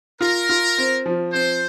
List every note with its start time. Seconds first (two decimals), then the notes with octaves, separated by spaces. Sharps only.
0.21 F4 A#4
0.49 F4
0.78 C4
1.06 F3
1.33 C4 C5